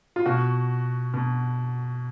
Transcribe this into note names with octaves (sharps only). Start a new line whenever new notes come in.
F4
B2 F#4
B2